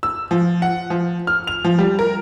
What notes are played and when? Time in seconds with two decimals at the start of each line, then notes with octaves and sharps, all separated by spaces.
0.03 E6
0.31 F3
0.62 F#5
0.90 F3
1.27 F6
1.47 F7
1.64 F3
1.78 G3
1.99 A#4